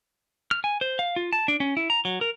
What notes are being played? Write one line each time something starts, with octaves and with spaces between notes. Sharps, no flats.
F6
G#5
C5
F5
F4
A5
D4
C#4
E4
A#5
F#3
A#4